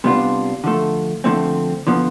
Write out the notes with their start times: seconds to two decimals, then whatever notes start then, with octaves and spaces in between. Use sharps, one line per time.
0.04 C3 G3 B3 D4 F4
0.64 D3 F3 A3
1.24 D3 F3 A3 C4
1.87 D3 F3 B3